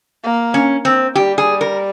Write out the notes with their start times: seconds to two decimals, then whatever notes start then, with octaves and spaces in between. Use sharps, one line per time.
0.24 A#3
0.54 C#4
0.85 C4
1.15 G3 G4
1.38 G#4
1.61 A#4